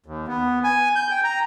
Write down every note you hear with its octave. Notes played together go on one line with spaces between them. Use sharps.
D#2
B3
G#5
G6
G5
A#5